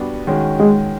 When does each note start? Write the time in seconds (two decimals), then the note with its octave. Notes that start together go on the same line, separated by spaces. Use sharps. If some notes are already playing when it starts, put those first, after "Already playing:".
Already playing: G3 B3 D4 F#4
0.27 D#3 G#3 C#4 F#4
0.60 G#3